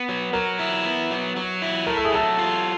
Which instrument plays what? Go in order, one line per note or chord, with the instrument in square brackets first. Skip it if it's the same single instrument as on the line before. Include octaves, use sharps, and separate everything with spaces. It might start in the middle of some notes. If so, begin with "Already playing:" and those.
Already playing: [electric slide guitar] B3
F#3
[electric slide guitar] F#3 [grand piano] A#4
[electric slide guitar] E4
B3
F#3
F#3
E4
[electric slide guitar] A3 [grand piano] A#4
[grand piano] A4
G#4
[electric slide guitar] F#3 [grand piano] A4
[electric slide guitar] F4